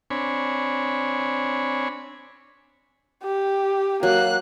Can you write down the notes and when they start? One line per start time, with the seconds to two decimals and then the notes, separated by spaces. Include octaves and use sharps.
0.11 C4 D4 C#5 G#5 B5
3.24 G4
4.03 F#3 A#3 F#6